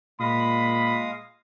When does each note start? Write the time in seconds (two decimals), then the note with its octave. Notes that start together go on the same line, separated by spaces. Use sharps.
0.20 A#2 G#3 F5 B5 D#6